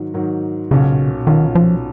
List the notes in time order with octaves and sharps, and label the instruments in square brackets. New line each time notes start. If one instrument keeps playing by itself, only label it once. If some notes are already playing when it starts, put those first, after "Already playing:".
Already playing: [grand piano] G#2 D#3 F#3
G#2 D#3 F#3
[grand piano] B1 A#2 F#3 C#4 F4 [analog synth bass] C#3
[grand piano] B1 A#2 F#3 C#4 F4 [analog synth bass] D#3
[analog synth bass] F3